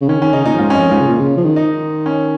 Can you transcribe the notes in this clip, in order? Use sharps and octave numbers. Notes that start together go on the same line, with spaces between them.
C#3
D#3 C#4
D#3 C#4
C#3 D#4
A#2 D#4
F2
G#2 F4
C#4
F2 D#4
G#2 F4
C#3
A#2
C#3
F3
D#3
D#4
C#4